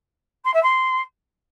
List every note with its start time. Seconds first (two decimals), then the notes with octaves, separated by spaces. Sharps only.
0.44 C6
0.53 E5
0.62 C6